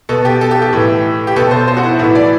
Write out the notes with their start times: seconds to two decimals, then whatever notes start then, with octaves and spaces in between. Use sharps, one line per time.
0.09 B2 A4
0.25 G4
0.41 A4
0.51 G4
0.62 G4
0.73 A2 E3
1.27 G4
1.36 B2 A4
1.51 C5
1.68 C5
1.77 F#4
1.83 E4
1.99 A2 E3 E4
2.15 D5